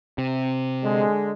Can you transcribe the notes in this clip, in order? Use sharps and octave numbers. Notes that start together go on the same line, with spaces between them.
C3
D3 G#3